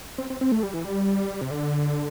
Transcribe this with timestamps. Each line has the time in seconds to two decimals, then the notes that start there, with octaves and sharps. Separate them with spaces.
0.18 C4
0.30 C4
0.41 C4
0.52 A3
0.63 G3
0.74 E3
0.84 G3
1.41 C3
1.51 D3